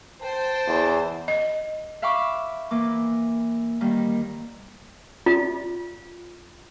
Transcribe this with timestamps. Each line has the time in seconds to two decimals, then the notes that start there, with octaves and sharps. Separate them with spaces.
0.23 C5 G5 A5
0.67 E2
1.28 D#5
2.02 E5 F5 G5 B5 C#6 D6
2.71 E3 A#3 D6
3.81 D#3 G3 A#3
5.26 F4